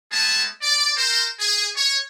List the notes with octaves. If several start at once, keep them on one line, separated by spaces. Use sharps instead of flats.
G#3 A3 B3 G#4 A5
D5
A#4 C5
G#4
C#5